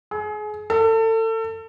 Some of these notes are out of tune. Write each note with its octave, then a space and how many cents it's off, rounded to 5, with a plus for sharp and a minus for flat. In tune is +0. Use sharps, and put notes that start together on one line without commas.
G#4 +30
A4 +30